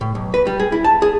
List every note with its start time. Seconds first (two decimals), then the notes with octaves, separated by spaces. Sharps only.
0.01 A2
0.15 B1
0.34 B4
0.47 G3
0.60 G#4
0.72 E4
0.84 A5
1.02 G#4